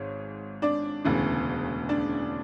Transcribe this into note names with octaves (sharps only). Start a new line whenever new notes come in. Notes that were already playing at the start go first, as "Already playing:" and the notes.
Already playing: G#1 G#2 C#5
D4 D5
E1 D2 C#3 E3
D4 D5